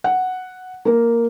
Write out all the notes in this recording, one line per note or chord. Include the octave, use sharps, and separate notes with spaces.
F#5
A#3 A#4